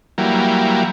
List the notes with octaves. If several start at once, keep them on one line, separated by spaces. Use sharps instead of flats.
E3 F#3 G3 A#3